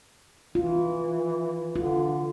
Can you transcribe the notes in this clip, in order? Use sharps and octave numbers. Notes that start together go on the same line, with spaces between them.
E3 F4
D3 F4